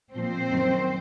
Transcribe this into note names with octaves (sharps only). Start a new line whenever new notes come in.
A#2 F3 C4 C5
F#2 D#3 F#3